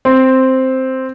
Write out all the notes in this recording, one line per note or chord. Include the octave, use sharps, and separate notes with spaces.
C4